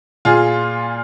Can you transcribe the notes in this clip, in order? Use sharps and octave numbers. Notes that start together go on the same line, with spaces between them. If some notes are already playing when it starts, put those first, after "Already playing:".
A#2 F4 G#4